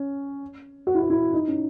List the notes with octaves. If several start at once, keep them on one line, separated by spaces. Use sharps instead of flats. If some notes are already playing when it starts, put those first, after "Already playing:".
Already playing: C#4
F#4
E4
F#4
E4
D#4
C#4